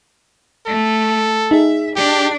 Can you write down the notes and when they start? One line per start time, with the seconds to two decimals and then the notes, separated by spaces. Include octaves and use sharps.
0.67 A3 A4
1.51 D#4 G#4 E5
1.96 D4 G4